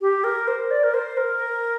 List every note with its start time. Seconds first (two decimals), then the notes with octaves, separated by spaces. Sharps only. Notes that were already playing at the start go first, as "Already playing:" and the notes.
0.01 G4
0.24 A#4
0.48 C5
0.71 D5
0.83 A#4
0.94 C5
1.17 A#4